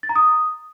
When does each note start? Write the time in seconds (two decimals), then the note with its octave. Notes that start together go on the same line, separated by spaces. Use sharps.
0.03 A6
0.09 A#5
0.16 D#6